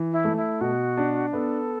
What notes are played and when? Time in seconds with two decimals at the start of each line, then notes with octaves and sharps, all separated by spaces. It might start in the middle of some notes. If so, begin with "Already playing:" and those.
Already playing: E3
0.12 E4
0.24 A3
0.37 E4
0.61 B2 F#4
0.97 D4
1.33 B3 A4